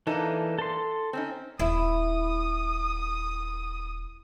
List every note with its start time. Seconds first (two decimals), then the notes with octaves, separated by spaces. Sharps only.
0.07 E3 A#3 D4 D#4 A4
0.58 A4 C6
1.13 C4 C#4 D#4
1.59 D#1 E4 D#6